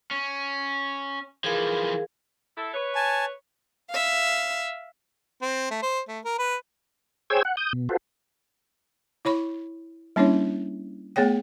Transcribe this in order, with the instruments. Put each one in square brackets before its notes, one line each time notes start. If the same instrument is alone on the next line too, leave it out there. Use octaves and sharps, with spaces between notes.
[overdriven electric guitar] C#4
[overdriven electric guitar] E3 F3 [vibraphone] G#4 A#4 F5
[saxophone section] E4 A4
B4 C#5
[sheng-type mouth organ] G#5 A5
[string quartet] E5 F5
[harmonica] C4
A3
C5
A3
A#4
B4
[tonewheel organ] G#4 C5 C#5 G5 E6 G#6
F#5
D#6 G6
B2
F4 F#4 A4 B4 C5
[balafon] E4 C#5 B5 C#6
G3 A#3 C#4 D4 E4 C#5
A3 B3 G#4 C#5 G5